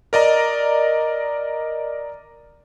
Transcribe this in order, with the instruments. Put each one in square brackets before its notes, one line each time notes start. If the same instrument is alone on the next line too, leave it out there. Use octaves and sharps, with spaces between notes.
[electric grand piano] A#4 D5 D#5 A#5